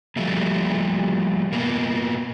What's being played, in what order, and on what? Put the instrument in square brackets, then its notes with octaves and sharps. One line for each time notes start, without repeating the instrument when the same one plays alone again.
[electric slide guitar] F3 G3 A3 A#3
B2 A#3 B3